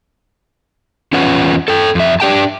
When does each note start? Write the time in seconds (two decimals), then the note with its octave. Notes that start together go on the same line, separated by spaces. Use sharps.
1.13 E2 C#4 F4 B4 F#5
1.68 A4 G5
1.95 F2 E5
2.20 D4 G4 G5 A5